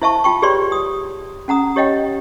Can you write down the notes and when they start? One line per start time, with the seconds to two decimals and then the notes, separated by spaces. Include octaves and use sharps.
0.02 E4 C5 E5 F5 A5 C#6
0.24 F4 G5 C#6
0.42 G4 G#4 B4 C#5 D5 C6
0.72 D#6
1.48 C#4 F#5 A#5 D#6
1.76 G4 C#5 D#5 F5 G5